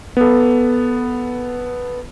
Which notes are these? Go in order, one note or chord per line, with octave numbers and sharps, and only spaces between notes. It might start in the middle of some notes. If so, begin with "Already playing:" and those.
B3 A4